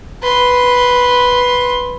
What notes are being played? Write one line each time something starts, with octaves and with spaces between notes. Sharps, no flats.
B4 C6